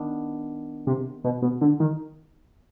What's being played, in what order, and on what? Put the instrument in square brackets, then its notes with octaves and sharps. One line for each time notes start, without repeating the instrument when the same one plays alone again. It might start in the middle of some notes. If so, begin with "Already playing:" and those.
Already playing: [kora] D#3 B3 D4
[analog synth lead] C3
B2
B2
D3
D#3